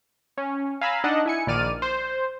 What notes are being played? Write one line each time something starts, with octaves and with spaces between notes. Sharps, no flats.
C#4
F5 G#5 A#5 B5 E6
D4 D#4 D#5 F#5 A5
E4 G#5 C#7
A#1 D#3 D5 F6 D#7
C5